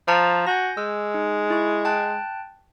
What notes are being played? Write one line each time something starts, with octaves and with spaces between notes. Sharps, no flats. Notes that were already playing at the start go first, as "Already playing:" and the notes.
F3 A5 A#5
F#4 G#5 G6 A#6
G#3 E6
D#4
E4 C#6
G5 A5 F#6